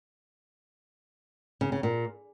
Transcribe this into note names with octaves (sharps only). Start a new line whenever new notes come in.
C#3
C#3
A#2